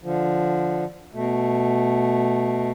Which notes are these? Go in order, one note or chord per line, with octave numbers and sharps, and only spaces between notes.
D3 F3
B2 A3